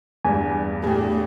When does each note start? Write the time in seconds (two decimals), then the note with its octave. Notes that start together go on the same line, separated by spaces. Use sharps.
0.25 E2 G2 G#5
0.84 A2 G4 G#4